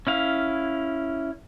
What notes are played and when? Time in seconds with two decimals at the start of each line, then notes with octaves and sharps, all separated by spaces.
0.07 C#4 E4 F5